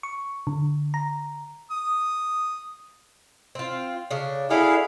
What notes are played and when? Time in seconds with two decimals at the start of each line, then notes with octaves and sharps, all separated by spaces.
0.03 C#6
0.47 D3
0.94 A#5
1.71 D#6
3.55 C4 F4
4.11 C#3 D4
4.50 D4 E4 F#4 G#4 A4 F5